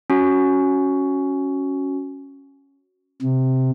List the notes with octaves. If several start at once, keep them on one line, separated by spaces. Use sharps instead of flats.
C#4 F#4
C3